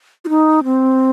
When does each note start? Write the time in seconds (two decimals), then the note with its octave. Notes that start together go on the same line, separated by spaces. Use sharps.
0.25 F4
0.29 D#4
0.64 C4